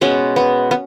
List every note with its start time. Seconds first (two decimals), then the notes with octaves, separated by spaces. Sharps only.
0.01 B2 G#3 B3 C#4
0.36 B3
0.71 B3